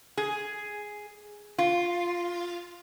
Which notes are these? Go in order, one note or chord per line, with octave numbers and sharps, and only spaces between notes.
G#4
F4